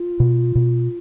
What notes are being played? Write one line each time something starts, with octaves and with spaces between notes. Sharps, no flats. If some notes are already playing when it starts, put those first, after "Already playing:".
Already playing: F4
B2
B2